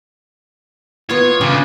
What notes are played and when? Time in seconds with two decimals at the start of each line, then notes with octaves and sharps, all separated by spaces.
1.10 B3 F4 C#5
1.41 C#3 G3 D4